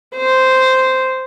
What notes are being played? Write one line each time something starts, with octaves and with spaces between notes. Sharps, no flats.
C5